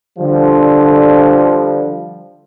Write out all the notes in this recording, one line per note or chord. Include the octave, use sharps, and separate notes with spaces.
D3 F3 G3